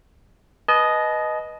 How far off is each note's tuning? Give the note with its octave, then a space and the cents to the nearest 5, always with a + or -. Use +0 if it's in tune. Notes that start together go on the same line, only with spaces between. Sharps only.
B4 -20 D#5 +0 A5 -45